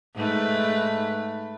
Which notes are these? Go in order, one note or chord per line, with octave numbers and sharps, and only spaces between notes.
G#2 A3 B4